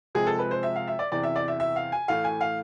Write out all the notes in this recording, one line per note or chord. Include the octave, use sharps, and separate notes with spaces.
C3 F3 G#3 G#4
A4
B4
C5
E5
F5
E5
D5
E2 C3 E3 D5
E5
D5
E5
E5
F5
G#5
A2 E3 A3 F5
G#5
F5